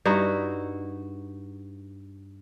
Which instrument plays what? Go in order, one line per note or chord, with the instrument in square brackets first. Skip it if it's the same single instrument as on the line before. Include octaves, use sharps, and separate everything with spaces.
[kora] G2 D#4 E4 F#4